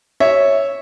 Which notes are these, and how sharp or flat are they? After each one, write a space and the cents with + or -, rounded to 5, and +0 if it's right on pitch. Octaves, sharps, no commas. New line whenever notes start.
C#5 +0 E5 -5